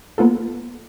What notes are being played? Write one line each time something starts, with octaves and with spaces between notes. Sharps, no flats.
A#3 B3 F4 A4